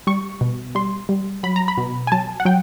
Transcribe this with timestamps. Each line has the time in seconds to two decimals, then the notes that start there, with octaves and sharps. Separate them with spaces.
0.07 G3 C#6
0.41 B2
0.75 G3 C6
1.09 G3
1.43 F#3 B5
1.56 A#5
1.68 B5
1.78 B2
2.07 G#5
2.12 F#3 A5
2.40 F#5
2.45 F#3 G5